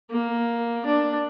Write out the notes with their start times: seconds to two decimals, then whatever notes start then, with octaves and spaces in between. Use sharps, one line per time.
0.10 A#3
0.86 D4